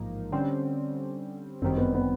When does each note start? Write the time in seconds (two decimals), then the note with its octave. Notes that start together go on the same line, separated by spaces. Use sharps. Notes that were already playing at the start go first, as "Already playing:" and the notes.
Already playing: A1 G#2 F3 A#3 D#4
0.32 D3 G3 C4 C#4
1.62 G1 F#2 D#3 G3 C4
1.78 B3
1.94 B3